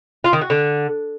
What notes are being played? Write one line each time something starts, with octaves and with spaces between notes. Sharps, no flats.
F4
D#3
F#4
D3